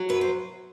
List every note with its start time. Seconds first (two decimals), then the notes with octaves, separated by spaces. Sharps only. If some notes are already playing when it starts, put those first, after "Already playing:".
Already playing: F#3
0.09 F#2 B4
0.21 C5